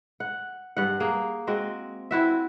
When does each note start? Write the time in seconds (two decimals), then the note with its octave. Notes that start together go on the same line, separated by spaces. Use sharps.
0.20 F#5
0.77 G2 F#5
1.00 A#3 G#4
1.47 G#3 C4 F#4
2.11 C4 E4 F#4 E5